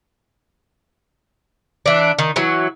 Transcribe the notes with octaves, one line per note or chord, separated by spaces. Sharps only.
E3 D4
D#3
E3 F#3